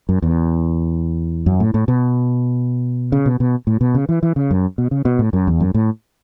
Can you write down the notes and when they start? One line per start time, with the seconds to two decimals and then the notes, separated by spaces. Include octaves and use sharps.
0.09 F#2
0.22 E2
1.46 F#2
1.60 A2
1.74 A2
1.88 B2
3.12 C#3
3.26 B2
3.40 B2
3.67 A2
3.81 B2
3.95 C#3
4.09 E3
4.23 E3
4.36 C#3
4.51 F#2
4.78 B2
4.91 C#3
5.05 B2
5.19 A2
5.33 F#2
5.47 E2
5.60 F#2
5.74 A2